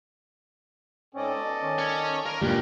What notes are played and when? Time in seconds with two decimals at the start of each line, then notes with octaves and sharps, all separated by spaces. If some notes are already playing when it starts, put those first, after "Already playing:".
1.15 G#2 C4 C#4 A4 D5 D#5
1.38 B2
1.62 D#3 C#4
1.78 C#5 G#5
2.26 A#4 F5
2.42 C#2 G2 A#2 G3 D4 G4 A#4